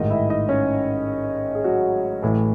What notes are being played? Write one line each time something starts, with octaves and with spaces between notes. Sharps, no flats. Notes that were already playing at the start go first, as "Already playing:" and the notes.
Already playing: A1 G#2 D#3 D#4 D#5
E4 E5
D#4 D#5
C#4 C#5
G#4
F#3 F#4
A1 A2 E3